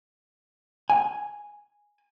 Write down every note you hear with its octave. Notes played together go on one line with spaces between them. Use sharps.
G#5